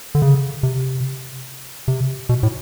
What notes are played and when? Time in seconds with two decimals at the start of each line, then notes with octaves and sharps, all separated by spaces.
0.15 D3
0.22 C#3
0.63 C3
1.88 C3
2.29 B2
2.43 A2